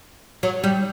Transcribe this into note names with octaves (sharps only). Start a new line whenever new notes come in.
F#3
G3